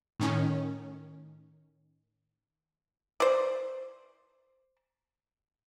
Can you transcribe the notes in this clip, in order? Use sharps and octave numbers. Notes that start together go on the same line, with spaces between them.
A2 D#3 C#4
C5 D5